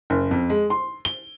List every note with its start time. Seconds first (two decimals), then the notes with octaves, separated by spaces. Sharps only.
0.10 F#1
0.31 F2
0.50 G#3
0.70 C6
1.05 G7